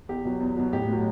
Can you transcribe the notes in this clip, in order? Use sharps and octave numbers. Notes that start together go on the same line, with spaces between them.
E2 G4
B2 F#3
E2
B2 F#3
A1 G4
A2 F#3